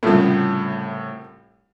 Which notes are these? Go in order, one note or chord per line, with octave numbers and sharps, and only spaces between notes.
C2 A2 C#3 F3 A3